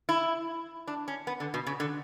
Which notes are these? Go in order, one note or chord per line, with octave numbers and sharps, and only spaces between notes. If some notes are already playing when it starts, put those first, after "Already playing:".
E4
D4
C#4
B3
D3
B2
C#3
D3